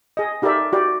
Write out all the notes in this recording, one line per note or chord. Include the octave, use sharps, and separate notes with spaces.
G#4 D#5
D#4 G4 A4 A#4 D5 E5
F#4 G4 D5